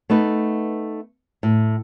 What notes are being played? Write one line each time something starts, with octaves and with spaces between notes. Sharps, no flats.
A3 B3 D#4 B4
A2